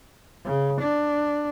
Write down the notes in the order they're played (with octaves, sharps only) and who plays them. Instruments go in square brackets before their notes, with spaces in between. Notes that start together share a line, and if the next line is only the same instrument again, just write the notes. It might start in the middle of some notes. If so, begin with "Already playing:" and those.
[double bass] C#3
D4